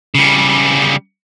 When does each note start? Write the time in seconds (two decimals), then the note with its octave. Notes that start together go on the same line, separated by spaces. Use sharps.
0.15 C#3 G3